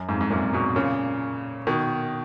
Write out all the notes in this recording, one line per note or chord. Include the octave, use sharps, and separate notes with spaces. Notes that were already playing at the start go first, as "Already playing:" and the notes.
Already playing: F#2
F2 G#2
G#2
F#2 A#2
G#2 B2
A#2 C#3
B2 D#3